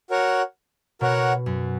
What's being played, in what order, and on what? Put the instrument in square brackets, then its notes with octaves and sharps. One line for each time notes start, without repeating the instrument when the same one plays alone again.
[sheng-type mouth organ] F#4 A#4 C#5 F#5
[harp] B2 [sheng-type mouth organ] F#4 A#4 C#5 F#5
[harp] F#2